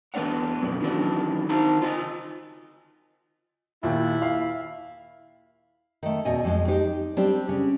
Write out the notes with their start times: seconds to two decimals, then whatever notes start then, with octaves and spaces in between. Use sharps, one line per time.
0.14 E2 B3 C4 D4 C#5 F#5
0.62 F#2 B2 F3
0.80 D#3 E3 F#3 C#4 D4
1.49 D#3 D#4 C5 A5
1.82 F4 D#5 G#5
3.83 D#2 A#2 E4
4.22 F5
6.03 D#3 A3
6.25 E2 B2 D#5 G#5
6.44 F2 G#3
6.68 D#4 G4 C5
7.17 G3 C4 D4
7.49 C#3